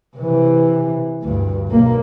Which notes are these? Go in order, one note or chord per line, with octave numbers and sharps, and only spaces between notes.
C3 E3
D2 G2
B1 A#3